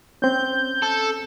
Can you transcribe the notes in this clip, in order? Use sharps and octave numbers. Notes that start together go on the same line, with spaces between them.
C4 C#4 G6
A4